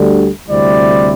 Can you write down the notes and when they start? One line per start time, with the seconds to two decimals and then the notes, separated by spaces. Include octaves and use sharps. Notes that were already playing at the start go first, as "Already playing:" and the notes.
Already playing: D2 D3 G3
0.49 D2 C3 G3 C4 E4 D5